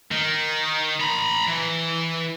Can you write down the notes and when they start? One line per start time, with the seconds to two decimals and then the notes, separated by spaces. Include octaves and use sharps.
0.11 D#3
1.01 A#5 B5
1.48 E3